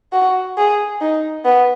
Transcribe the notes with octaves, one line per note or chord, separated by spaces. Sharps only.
F#4
G#4
D#4
B3